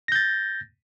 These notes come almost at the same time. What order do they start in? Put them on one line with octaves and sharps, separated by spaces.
A#6 G6 A6